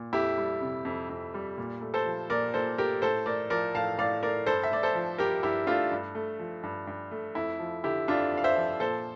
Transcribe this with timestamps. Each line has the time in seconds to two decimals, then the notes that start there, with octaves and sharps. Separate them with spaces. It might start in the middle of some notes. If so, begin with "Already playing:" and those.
Already playing: A#2
0.13 F2 E4 G4
0.38 G3
0.61 C3
0.85 F2
1.09 F2
1.34 G3
1.58 A#2
1.81 A3
1.94 A4 C5
2.06 F3
2.30 A#2 A#4 D5
2.54 A#2 A4 C5
2.78 A3 G4 A#4
3.02 A2 A4 C5
3.26 A3 A#4 D5
3.50 F3 A#4 D5
3.75 A2 F5 A5
3.98 A2 D5 F5
4.23 A3 A#4 D5
4.46 G2 A4 C5
4.63 E5
4.71 A3 D5
4.83 A4 C5
4.95 F3
5.18 G2 G4 A#4
5.43 G2 E4 G4
5.67 A3 D4 F4
5.91 G2
6.15 A3
6.39 F3
6.63 G2
6.87 G2
7.11 A3
7.35 F2 E4
7.60 F3
7.84 D3 E4 G4
8.08 F2 D4 F4
8.32 F2
8.38 F5
8.44 C5 E5
8.56 F3
8.80 A#2 A4 C5